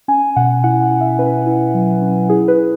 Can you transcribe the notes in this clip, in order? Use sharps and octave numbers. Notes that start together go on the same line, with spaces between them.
C#4 G#5
B2 F#5
E4 F#5
F#5
E4
E5
C#4 B4
E4
F#3
C#4
E4 G#4
B4
E4